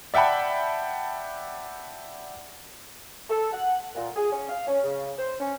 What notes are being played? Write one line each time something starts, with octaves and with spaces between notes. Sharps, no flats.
D5 E5 F#5 G5 A5 B5
A4
F#5
A#2
G#4
C#4
F5
C#4
C#3
C5
C#4